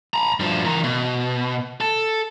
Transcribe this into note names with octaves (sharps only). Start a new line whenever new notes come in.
A#5 B5
G2 F3
E3 A#4
B2
A4